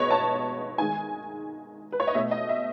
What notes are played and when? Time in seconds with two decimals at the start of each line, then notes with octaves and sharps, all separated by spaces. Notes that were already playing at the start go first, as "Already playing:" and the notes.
Already playing: B2 G#3 B4 C#5 D#5
0.10 A5
0.78 D#3 G#3 G#5
1.92 B4
2.00 C#5
2.07 D#5
2.14 B2 A3 E5
2.31 D#5
2.49 E5